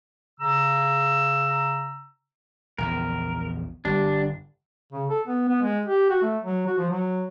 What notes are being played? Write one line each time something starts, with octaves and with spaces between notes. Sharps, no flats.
C#3 A#5 E6
A#1 E2 C#3 A#4
G1 G3 D4
C#3
A4
B3
B3
G#3
G4
F#4
A3
F#3
F#4
F3
F#3